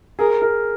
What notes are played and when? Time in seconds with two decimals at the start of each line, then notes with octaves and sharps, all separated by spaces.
0.19 G#4 A#4
0.42 A#4